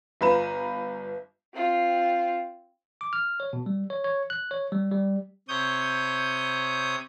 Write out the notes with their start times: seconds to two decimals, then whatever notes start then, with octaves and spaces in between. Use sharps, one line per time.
0.21 G1 F4 B4 A#5 E7
1.54 C4 F4
3.01 D6
3.13 F6
3.40 C#5
3.53 B2
3.66 G3
3.90 C#5
4.04 C#5
4.30 F#6
4.51 C#5
4.72 G3
4.91 G3
5.48 C3 C#5 D#6 G6